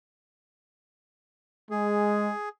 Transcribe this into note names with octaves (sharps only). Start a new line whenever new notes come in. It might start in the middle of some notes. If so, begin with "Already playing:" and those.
G#3 G#4